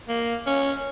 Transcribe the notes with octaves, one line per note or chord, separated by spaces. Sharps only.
A#3
C#4